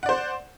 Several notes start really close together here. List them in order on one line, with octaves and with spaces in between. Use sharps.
F#5 D5 C5